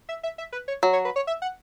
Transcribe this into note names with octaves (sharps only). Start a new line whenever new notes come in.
E5
E5
E5
B4
C#5
F#3
C#5
B4
C#5
E5
F#5